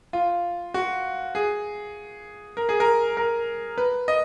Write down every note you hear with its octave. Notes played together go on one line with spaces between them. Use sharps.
F4
F#4
G#4
A#4
G#4
A#4
A#4
B4
D#5